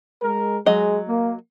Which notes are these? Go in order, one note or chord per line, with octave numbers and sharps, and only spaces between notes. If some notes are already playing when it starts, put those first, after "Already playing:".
G#3 A#4
F#3 G#3 D#5
A#3